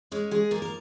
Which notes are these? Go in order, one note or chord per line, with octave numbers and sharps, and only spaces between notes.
G#3 C#4 C#5
G#3 G#4
F3 A#3 A#4
A#4